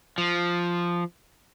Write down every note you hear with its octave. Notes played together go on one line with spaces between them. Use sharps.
F3